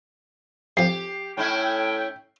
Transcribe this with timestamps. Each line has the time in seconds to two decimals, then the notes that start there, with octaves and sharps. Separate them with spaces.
0.77 F2 F3 G4 C7
1.37 A2 C#4 E4 A4 G5